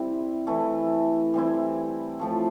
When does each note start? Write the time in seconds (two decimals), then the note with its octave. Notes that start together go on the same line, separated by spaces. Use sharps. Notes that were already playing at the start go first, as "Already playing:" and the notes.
Already playing: C3 G3 C4 E4
0.47 E3 A3 E4
1.34 E3 G3 C4 E4
2.19 A2 F3 A3